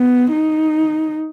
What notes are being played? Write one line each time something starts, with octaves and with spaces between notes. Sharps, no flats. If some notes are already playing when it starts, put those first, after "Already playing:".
Already playing: B3
D#4